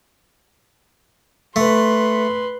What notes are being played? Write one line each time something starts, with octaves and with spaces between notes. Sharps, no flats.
A3 B4 C6